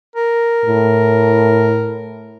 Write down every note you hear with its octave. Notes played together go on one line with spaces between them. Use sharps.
A#4
A2